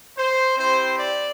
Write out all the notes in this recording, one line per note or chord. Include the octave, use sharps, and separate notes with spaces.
C5
C4 E4 G4 C5
D5